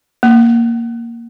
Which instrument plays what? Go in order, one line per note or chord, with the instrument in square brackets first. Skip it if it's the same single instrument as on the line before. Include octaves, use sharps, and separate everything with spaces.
[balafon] A#3